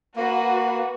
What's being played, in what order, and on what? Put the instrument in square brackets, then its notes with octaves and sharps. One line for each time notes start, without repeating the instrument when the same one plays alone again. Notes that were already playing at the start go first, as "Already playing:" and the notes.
[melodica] A#3 [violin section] F#4 B4